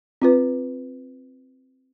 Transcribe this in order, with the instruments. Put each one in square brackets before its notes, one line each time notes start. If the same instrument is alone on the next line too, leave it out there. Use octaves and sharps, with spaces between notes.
[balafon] C4 F4 B4